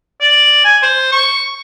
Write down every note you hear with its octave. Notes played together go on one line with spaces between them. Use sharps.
D5
G#5
C5
C#6